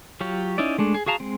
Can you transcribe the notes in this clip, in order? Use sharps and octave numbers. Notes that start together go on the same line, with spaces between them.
F#3 F4 G4 C#5
C#4 D#4 E4 D5
G#3 A3 D4
G#4
F#4 G#4 F5 A5 A#5
G#3 C4